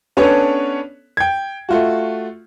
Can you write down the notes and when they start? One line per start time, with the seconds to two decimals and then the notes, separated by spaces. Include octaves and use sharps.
0.17 B3 C#4 D4 A4 B4 C#5
1.17 G5 G#6
1.69 A3 F4 F#4